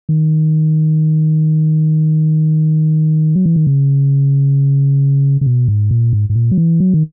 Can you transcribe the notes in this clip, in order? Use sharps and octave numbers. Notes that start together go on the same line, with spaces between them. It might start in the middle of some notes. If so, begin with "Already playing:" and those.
D#3
F#3
E3
D#3
C#3
C#3
B2
G#2
A#2
G#2
G#2
A#2
F#3
E3
F#3
D#3